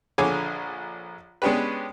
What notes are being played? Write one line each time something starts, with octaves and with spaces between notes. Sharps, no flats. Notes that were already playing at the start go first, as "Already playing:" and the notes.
A#1 D3 G#4 C#5 G#5 D6
G#3 B3 C#4 D4 G4 B4